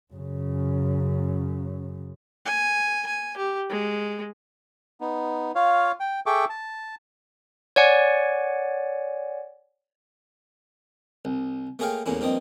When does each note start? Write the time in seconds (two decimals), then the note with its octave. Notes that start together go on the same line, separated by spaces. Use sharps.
0.13 F#2 C#3
2.46 G#5
3.07 G#5
3.37 G4
3.70 G#3
5.01 B3 D#4
5.55 F4 C#5 F5
6.00 G5
6.26 G#4 A4 E5 G5 C#6 D6
6.50 A5
7.76 C#5 D5 F#5 G#5
11.25 C2
11.79 A3 A#3 G#4 C#5 F5 G5
12.06 E2 A2 A#3 C#4 E4
12.20 G2 F3 A#3 C4 D#5